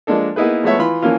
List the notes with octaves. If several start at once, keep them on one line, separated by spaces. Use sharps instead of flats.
F3 G#3 A#3 D4 A4
A#3 B3 D#4 E4 G#4 B4
F3 G#3 A3 B3 C#5 E5
E3 F4 B5 C6
E3 F3 A#3 C#4 F4